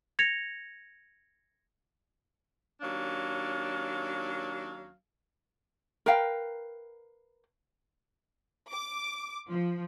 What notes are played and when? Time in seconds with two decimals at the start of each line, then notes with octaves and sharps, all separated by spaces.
0.19 G#6 A#6 C#7 F7
2.80 D#2 F#3 C#4 D4 F5
6.06 A#4 B4 F5 G5
8.72 D6
9.48 F3